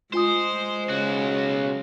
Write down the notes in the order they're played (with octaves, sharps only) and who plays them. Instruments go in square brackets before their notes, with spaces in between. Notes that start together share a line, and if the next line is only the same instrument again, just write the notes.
[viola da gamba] G#3 [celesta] F4 G#5 D#6 [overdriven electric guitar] C5
[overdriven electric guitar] B1 F#4 [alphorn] C#3